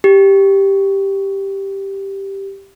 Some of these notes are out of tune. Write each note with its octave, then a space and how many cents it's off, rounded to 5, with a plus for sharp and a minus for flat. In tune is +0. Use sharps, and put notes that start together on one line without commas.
G4 +0